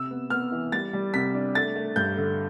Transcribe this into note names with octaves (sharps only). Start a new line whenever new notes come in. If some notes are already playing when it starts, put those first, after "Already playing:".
Already playing: C3 E6
B3
B3 F6
E3
G3 A6
G3
C3 B6
D4
A3 A6
A3
G2 G6
D3